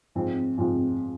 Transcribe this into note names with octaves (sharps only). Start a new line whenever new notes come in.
G#2 F3 C4
G#2 F3 C4